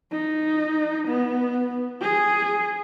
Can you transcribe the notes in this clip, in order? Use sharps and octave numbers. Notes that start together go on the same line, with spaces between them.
D#4
B3
G#4